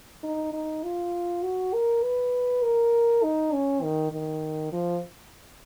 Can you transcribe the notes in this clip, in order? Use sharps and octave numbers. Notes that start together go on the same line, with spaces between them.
D#4
D#4
F4
F#4
A#4
B4
A#4
D#4
C#4
D#3
D#3
F3